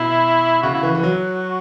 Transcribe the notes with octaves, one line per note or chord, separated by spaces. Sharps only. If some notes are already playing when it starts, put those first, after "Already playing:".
Already playing: B2 E4
C#3 F#4
E4
E3 F#4
E3
F#3